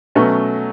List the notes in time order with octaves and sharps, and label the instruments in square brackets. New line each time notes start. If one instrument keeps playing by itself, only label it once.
[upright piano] B2 F#3 A3 C#4